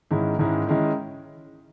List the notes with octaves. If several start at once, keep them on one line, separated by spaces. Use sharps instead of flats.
G#2 D#3 G#3 C#4 E4
G#2 D#3 G#3 C#4 E4
D#3 G#3 C#4 E4